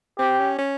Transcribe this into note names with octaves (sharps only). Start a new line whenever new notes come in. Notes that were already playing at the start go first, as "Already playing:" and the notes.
C4 G4
C#4
C#4